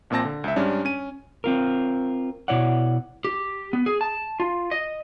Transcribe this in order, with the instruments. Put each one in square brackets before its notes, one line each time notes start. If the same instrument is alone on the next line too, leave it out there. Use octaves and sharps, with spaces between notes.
[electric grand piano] A#1 A#2 C4 A5 A#6
D3
C#2 E5
G#2 G3 C#4 D4
C#4 D#7
[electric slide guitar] C4 F4 A#4
B2 E4 C#5 D5 F#5
G4
B3
G#4
A5
F4
D#5